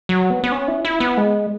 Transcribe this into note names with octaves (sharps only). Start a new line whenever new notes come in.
F#3
B3
B3
C#4
E4
E4
B3
G#3